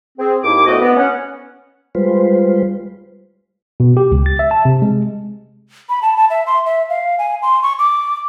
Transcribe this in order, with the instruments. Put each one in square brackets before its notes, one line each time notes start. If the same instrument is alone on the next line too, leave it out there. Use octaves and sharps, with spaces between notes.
[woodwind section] C4 G#4
D#2 E4 D6
D2 A2 B3 F#4 D#5
B3
C#4 F#5
[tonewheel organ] G3 G#3 F4 B4 C5
[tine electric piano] B2
G4
C#2
A6
E5
A5
C3
G#3
[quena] B5
A5
A5
E5
C6
E5
F5
G#5
C6
C#6
D6